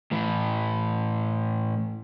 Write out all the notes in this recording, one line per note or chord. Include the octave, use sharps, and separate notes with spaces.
A2 E3